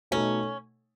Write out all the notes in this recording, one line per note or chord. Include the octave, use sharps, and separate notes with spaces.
B2 A3 C#4 D#4 A4